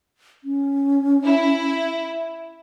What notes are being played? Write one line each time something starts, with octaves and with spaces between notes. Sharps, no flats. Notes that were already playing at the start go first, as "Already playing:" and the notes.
C#4
E4